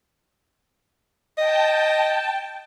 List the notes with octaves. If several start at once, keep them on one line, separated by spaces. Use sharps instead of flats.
D#5 G5 A5